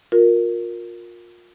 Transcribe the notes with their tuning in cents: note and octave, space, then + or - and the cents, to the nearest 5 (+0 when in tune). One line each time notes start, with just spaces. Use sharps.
F4 +30 A#4 +0